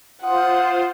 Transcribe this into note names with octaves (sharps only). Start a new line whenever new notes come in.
F4 C5 F#5 D#6